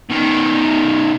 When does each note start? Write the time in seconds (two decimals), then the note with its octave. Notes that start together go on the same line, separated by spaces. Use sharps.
0.10 B2 D#3